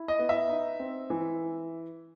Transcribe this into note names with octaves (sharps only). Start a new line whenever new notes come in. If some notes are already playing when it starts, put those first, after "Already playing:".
Already playing: E4
D#5
B3
E5
D#4
C4
E3